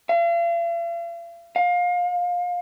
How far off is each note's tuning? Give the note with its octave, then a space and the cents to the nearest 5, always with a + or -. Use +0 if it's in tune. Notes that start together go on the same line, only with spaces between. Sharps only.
F5 -45
F5 +25